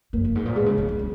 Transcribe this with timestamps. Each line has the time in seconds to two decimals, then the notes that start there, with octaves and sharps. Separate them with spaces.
0.13 F#2 A#3
0.25 F#2
0.35 G#2
0.46 A#2
0.56 B2 G#3
0.66 C#3
0.78 G#3
0.89 G#3
0.99 F#3